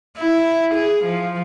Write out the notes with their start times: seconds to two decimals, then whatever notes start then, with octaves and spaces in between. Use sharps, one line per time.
0.17 E4
0.75 G#4
1.04 F3